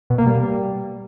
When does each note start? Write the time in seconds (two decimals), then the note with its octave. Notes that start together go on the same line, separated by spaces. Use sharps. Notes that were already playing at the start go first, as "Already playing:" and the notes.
0.10 B2
0.18 A#3
0.27 G3